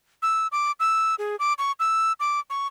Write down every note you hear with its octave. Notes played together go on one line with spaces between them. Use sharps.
E6
D6
E6
G#4
D6
C#6
E6
D6
C#6